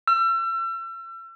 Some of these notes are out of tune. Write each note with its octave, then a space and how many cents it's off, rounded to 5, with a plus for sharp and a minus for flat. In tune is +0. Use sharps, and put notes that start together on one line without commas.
E6 +40